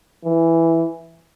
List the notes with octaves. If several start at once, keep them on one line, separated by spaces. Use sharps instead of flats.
E3